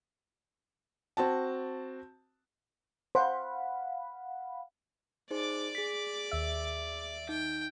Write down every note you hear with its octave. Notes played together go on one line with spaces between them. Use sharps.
C4 F#4 A5
C5 F5 F#5 B5
D#4 G#4 C5 D5 D6
G#4 B6
D#2 E5
D#4 G5